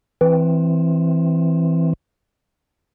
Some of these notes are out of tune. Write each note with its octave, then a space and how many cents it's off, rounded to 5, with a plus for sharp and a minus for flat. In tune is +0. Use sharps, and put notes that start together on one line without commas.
E3 +0 C4 +0